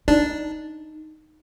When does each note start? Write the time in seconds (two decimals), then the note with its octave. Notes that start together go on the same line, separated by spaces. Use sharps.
0.08 D4 D#4